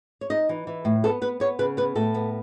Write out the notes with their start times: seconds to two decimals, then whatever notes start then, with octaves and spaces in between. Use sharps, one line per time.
0.21 C#5
0.30 D#4 D#5
0.49 E3
0.67 E3
0.85 A2
1.04 B3 A4
1.22 B3 B4
1.40 B3 C#5
1.59 C#3 B4
1.77 B3 B4
1.95 A2 A4
2.14 B3